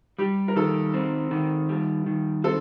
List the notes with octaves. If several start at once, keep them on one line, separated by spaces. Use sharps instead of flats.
G3 G4
A#4
D#3 A4
C4
D#3
G3
D#3
C4 A4